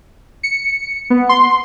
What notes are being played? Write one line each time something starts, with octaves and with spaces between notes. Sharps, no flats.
C#7
B3
C6